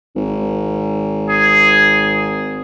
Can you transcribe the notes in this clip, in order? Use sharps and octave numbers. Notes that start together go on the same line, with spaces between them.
G#1
G#4